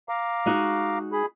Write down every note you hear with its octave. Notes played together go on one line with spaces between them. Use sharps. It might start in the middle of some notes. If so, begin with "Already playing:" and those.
F5 A#5 D6
G#3 D#4 F#4
G#4 B5